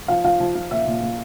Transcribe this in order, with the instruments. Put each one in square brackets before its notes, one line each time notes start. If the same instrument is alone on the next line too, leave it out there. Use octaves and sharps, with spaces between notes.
[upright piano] F3 F5
F3 F5
F3
F3
A#2 E5
A#2
A#2